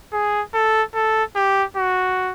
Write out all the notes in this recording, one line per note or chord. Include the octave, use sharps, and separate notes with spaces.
G#4
A4
A4
G4
F#4